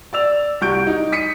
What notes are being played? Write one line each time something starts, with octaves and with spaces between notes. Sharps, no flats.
D5 E6 F7
C2 F#4 C#6 G6 D7
D#4
D#6 B6 C#7 D#7